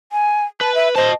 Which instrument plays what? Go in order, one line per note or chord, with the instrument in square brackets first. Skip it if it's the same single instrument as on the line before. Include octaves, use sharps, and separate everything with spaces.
[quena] G#5
[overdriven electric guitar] B4 [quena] A5
[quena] E5
[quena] C5 [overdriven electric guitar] D#5 A5